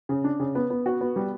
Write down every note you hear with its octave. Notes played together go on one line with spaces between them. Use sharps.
C#3
D4
C#3
B3
B3
F#4
B3
G3